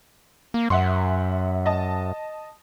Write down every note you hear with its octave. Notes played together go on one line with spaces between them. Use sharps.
A#3
F#2 E5 F#5 C6
D#5 A5